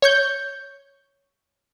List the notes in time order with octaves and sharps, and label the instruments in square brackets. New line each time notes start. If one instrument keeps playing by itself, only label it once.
[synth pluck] C#5 C#6 G6